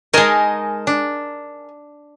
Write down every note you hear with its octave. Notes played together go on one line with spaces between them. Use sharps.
G#3 D#4 A#4 G#5 A5
D4